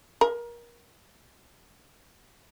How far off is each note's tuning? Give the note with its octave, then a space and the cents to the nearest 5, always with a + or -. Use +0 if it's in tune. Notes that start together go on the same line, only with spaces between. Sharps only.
A#4 +25